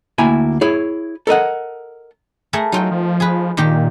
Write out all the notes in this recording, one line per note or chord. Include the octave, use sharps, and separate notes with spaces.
D2 A#3 E4 G5 G#5 A#5
E4 G#4 C#5
A4 A#4 D#5 F#5
A3 G#4 A#4
F#3 D#4 F4 G5
F3
G#4 B4
A#2 D#3 A#3 G4